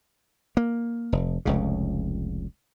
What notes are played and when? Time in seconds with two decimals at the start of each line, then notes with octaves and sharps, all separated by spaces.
0.57 A#3
1.12 F1
1.45 F1 C#2 C#3